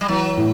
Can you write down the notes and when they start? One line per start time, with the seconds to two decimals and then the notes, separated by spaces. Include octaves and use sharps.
0.01 G3
0.08 E3 F#3
0.37 A2